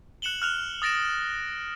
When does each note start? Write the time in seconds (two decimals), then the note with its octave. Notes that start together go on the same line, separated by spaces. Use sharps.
0.22 F#6 C#7 E7 F#7 G7
0.42 F6 F#6 F7
0.82 D#6 A6 A#6 D7 E7